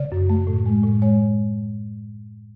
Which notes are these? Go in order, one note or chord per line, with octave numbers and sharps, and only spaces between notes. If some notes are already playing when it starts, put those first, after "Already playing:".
Already playing: C#3 D5
F#2
A3
A2
G#3
A2
G#3 C#5